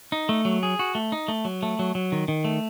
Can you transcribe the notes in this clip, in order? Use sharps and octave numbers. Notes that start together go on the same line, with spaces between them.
D#4
A3
F#3
G#4
F#4
A3
D#4
A3
F#3
A3
F#3
F#3
D#3
D#3
A3